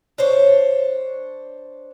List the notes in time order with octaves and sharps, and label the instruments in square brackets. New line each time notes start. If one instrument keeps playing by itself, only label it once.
[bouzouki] D4 C5 C#5